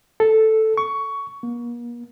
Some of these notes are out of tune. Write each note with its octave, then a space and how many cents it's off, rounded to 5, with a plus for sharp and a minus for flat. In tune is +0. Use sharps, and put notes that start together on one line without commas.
A4 +0
C#6 +15
A#3 +40